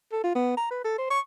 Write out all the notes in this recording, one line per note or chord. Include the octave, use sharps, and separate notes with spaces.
A4
F4
B3
A#5
B4
A4
C5
C#6